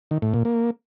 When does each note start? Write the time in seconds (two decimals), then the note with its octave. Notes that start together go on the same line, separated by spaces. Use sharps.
0.11 D#3
0.22 A2
0.34 A#2
0.45 A#3